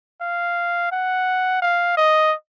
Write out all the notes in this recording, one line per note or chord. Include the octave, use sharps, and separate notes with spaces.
F5
F#5
F5
D#5